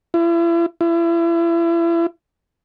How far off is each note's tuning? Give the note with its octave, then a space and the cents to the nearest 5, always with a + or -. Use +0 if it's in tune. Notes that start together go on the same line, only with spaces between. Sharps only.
E4 +40
E4 +35